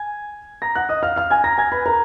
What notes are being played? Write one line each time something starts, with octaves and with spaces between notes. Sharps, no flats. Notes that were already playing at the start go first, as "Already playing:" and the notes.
Already playing: G#5 G#6
A#5 A#6
F#5 F#6
D#5 D#6
F5 F6
F5 F6
G#5 G#6
A#5 A#6
G#5 G#6
B4 B5
A#4 A#5